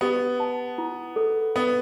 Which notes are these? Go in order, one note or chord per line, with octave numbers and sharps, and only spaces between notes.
B3 G4
A5
E4
A4
B3 B4